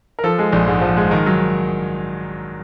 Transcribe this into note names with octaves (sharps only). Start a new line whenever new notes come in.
A#4
F3 A4
G#3
A#1
G#2
F3
G#3
D#3 A#4
F#3